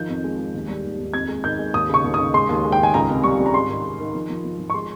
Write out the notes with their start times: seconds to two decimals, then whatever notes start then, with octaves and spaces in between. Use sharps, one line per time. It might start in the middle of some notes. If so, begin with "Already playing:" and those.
Already playing: D#3 F3 G6
0.09 F2
0.24 G#3
0.39 G#3
0.54 D#2
0.69 G3
0.83 D#2
0.99 D#2
1.13 F2 G#6
1.28 G#3
1.44 D#3 G6
1.59 G#3
1.74 D#2 D#6
1.89 C#3 C#6
2.04 D#2
2.14 D#6
2.19 C#3
2.34 G#3 C6
2.49 D#2
2.65 G#3
2.72 G5
2.79 D#3 G#5
2.94 C#2 A#5
3.09 C3
3.24 G3 C#6
3.39 G3
3.46 A#5
3.54 G#2 C6
3.69 D#3
3.84 G#2
3.99 D#3
4.14 F3
4.29 F3
4.44 F3
4.59 F3
4.70 C#6
4.74 G#3 C6